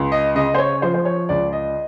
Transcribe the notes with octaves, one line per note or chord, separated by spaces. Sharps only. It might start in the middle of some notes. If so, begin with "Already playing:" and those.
Already playing: C#2
D#5
C#3 D#5
C5
C#5
F3 C5
C5
C#5
C#2 D5
D#5